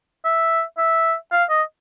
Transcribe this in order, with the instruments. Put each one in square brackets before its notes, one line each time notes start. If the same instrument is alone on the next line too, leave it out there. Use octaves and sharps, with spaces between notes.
[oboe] E5
E5
F5
D#5